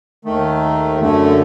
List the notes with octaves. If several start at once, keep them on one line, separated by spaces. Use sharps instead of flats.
D#2 D#3 A3
F#2 D3 A3